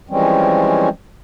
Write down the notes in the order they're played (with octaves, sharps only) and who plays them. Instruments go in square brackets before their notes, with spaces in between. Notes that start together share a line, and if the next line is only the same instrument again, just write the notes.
[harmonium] E3 F3 G3 G#3 C4 C#4